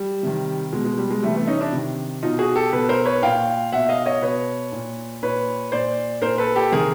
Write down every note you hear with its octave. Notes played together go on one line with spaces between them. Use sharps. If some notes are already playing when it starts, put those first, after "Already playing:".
Already playing: G3
C3 D#3
B2 G#3
G#3
G3
G#3
C3 E3 G3 A3
A3 B3
C#4 D#4
D4 E4
C3 D#3
B2 D#4 F4
F#4 G#4
G4 A4
B2 A4 B4
A#4 C5
B4 C#5
A#2 F5 G5
B2 E5 F#5
D#5 F5
C#5 D#5
B2 B4 C#5
A#2
A#2 B4 C#5
A#2 C5 D5
A#2 A#4 C5
A4 B4
G4 A4
C3 D#3 G#4 A#4